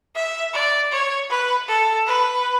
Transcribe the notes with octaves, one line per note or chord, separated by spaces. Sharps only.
E5
D5
C#5
B4
A4
B4